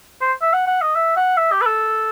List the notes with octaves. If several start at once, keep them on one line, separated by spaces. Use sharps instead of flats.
C5
E5
F#5
F#5
D#5
E5
F#5
E5
G4
B4
A4